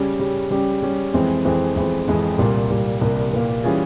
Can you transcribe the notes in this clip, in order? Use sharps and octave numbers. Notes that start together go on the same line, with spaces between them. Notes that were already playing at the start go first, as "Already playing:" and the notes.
Already playing: C#3 G3 C#4 G4
C#3 G3 C#4 G4
C#3 G3 C#4 G4
C#3 G3 C#4 G4
F2 E3 G#3 C4
F2 E3 G#3 C4
F2 E3 G#3 C4
F2 E3 G#3 C4
C2 A#2 G3 A#3
C2 A#2 G3 A#3
C2 A#2 G3 A#3
C2 A#2 G3 A#3
E3 G3 C#4 F4 G#4